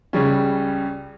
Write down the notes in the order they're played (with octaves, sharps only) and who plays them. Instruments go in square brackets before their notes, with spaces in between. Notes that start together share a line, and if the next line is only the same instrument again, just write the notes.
[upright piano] C#2 C#3 G3 C#4